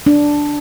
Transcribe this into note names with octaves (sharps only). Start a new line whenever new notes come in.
D4